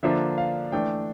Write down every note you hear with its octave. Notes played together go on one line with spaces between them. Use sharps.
D3 F3 A#3 D4 E5
F5
E3 A3 D4 G5